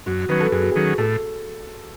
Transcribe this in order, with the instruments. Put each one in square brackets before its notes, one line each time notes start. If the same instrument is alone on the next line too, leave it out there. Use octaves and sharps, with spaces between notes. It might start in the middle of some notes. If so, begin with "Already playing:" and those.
[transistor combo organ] F#2 [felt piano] F#4
[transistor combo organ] D#3 F#3 C#4 [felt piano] B4
[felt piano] A4
[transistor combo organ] F#2 [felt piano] G#4
[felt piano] F#4
[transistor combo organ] D#3 F#3 C#4 [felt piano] G#4
[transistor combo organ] A2 [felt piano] A4